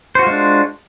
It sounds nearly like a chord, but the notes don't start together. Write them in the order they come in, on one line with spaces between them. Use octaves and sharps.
C5 F#4 F4 G#3 D4